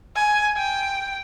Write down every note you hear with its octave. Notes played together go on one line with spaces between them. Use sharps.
G#5
G5